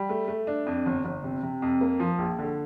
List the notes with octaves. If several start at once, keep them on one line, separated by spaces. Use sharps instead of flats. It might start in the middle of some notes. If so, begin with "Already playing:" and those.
Already playing: G3
A3
A3
D4
F2
G1
G1
C3
C3
F2
A#3
F3
A#1
D3